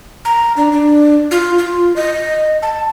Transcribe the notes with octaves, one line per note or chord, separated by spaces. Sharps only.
A#5
D4
D4
F4
F4
D#5
A5